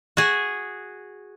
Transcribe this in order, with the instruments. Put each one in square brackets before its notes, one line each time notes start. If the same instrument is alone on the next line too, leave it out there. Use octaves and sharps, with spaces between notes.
[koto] F#4 G#4